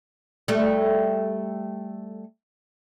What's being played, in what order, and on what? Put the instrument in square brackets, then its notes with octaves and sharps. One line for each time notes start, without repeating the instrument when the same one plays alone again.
[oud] G3 A3